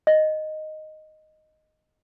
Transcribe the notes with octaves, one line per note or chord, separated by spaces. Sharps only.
D#5